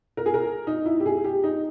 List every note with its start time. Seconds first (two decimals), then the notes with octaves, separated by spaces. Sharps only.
0.17 A#4
0.26 G#4
0.34 A#4
0.67 D#4
0.86 E4
1.00 G4
1.06 G#4
1.24 G4
1.44 D#4